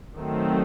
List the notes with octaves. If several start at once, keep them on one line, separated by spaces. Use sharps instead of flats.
D#3 F#3 A3 C4